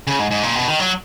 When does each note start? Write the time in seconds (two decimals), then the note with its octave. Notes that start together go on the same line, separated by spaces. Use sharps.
0.07 C#3
0.19 G#2
0.31 G#2
0.43 A#2
0.55 B2
0.67 D#3
0.79 F#3